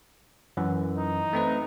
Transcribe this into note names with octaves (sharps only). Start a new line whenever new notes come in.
F#2 E3
D#4
A3 C4 B4